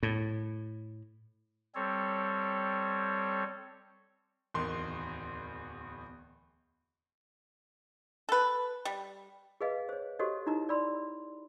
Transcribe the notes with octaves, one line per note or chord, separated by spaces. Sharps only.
A2
G3 C4 A4 C#5
D1 E2 D#3 C6
A4 B4
G3
G#4 B4 D#5 F5
C5 C#5
F#4 G4 A4 C5 C#5 D#5
D#4 E4 D#5 A#5
D5 B5 C6